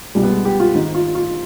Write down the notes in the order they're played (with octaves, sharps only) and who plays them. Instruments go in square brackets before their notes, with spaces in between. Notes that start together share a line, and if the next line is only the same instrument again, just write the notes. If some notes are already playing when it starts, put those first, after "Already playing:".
[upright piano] C2 B2 G3
B3
G#3
G4
F4
G#1 G#2 D#3 D#4
F4
F4